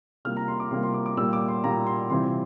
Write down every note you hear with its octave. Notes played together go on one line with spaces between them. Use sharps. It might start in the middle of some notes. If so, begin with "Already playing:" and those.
C3 G3 A#3 F4 F6
A#5
C6
D6
C3 G3 A#3 F4 C6
C6
D6
D6
A#2 G3 A#3 E6
D6
C6
A#2 G3 A#3 A#5
C6
C3 E3 G3 C4 F4 C6